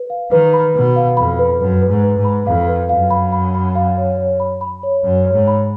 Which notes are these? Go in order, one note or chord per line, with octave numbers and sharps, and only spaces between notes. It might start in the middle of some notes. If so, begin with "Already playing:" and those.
Already playing: B4
F5
D#3 B4
B5
B2 B4
F5
F2 B5
B4
F#2 B4
B4
G#2
B4
G#2
B5
F2 F5
B4
F#2 F5
B5
B5
B5
F5
C#5
C#5
B5
B5
C#5
F#2 C#5
C#5
G#2
B5